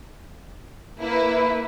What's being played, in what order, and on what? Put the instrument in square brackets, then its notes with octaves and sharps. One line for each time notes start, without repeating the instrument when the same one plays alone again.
[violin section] A#3 E4 B4